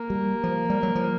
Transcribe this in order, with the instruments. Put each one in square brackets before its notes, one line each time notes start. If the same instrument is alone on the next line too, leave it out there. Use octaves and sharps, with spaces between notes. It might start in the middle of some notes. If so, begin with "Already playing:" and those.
Already playing: [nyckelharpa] A#3
[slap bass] G3
F3
G3
F#3
F3